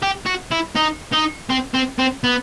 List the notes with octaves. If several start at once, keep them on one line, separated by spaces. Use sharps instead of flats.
G4
F#4
E4
D#4
D#4
C4
C4
C4
B3